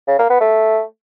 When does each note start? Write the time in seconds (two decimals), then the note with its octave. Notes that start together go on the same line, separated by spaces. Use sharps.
0.08 C#3
0.19 A#3
0.30 B3
0.41 A3